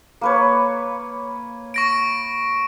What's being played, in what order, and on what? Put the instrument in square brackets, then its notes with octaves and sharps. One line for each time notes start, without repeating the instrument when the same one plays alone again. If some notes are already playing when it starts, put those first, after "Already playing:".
[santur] A#3 B4 C#5
[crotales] C#6 A#6 D7